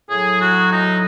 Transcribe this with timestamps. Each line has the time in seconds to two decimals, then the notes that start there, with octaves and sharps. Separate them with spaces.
0.10 A2 F#3 G#4
0.40 F#4
0.71 D#4